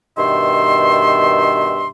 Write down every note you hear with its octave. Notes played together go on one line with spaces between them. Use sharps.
G2 B2 D#3 E5 C6